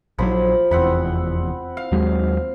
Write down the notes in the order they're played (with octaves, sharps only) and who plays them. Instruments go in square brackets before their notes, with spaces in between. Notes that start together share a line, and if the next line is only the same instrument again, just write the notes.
[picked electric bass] A#1 D#3 F#3 [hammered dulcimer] F3 B5
[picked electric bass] F1 E2 [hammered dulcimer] C4 F#5 B5
[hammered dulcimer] F5
[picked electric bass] D#2 F#3 G#3